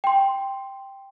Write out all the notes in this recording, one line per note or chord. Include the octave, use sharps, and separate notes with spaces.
G5 C6